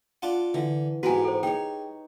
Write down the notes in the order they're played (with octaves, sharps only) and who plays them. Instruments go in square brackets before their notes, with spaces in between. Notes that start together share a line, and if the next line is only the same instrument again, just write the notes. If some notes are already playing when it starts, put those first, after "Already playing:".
[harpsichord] D4 F4 F#5
[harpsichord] D3 [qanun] E3
[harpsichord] G#2 B3 [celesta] F#4 G#5 [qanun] G4 A#4 B4
[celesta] A4 C5
[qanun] D#4 C#5 [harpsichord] G#4 [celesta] G5